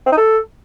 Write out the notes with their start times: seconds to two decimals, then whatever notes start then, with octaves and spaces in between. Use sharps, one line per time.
0.06 C4
0.12 D#4
0.17 A4